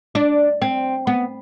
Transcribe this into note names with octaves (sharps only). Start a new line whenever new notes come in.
D4
C4
B3